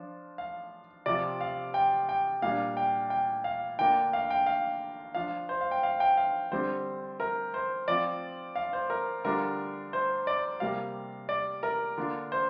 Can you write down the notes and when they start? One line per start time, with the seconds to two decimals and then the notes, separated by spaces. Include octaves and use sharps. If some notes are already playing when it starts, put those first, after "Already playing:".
Already playing: F3 D4 F4
0.38 F5
1.06 C3 F3 C4 F4 D5
1.41 F5
1.74 G5
2.09 G5
2.42 A#2 G3 D4 F5
2.77 G5
3.10 G5
3.44 F5
3.79 D3 A#3 D4 F4 G5
4.13 F5
4.30 G5
4.46 F5
5.15 F3 D4 F4 F5
5.49 C5
5.61 F5
5.71 G5
5.83 F5
6.00 G5
6.17 F5
6.51 D3 G3 C4 C5
7.20 A#4
7.54 C5
7.88 F3 C4 F4 D5
8.56 F5
8.73 C5
8.90 A#4
9.24 D3 G3 D4 F4 A#4
9.93 C5
10.27 D5
10.60 C3 G3 A#3 F5
11.29 D5
11.63 A#4
11.98 D3 A#3 D4 F4
12.32 C5